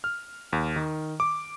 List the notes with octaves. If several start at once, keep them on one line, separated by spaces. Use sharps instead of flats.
F6
D#2
D#3
D6